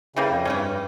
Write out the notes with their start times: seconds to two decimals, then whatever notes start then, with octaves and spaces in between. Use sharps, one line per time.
0.16 C#3 E3 G3 A#3
0.31 F2
0.45 G2 E3 A3 C#4